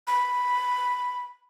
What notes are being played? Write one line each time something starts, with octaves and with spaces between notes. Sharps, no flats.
B5